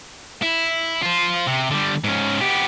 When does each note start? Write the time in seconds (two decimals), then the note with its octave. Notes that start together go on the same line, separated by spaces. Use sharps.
0.43 E4
1.03 F4 C5
1.47 C3
1.71 D3 G3
2.04 G#2 C#4
2.40 B3 G4